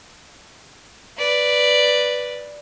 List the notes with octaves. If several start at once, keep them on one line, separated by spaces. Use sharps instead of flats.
B4 D5